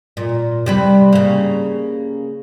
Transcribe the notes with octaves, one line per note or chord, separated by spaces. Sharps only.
A#2
C3 G3 B4
C#3 A#3